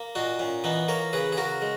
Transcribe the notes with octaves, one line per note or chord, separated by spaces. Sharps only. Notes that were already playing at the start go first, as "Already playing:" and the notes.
Already playing: A#3
A#2 D#4 F#4
A#2 C#4
E3 B3 D#4
A#3 A#4 C#5
C#3 G#4 B4
G#4
C#3 F#4 A#4
G#3